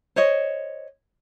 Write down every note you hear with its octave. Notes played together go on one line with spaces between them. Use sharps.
C5 C#5 D#5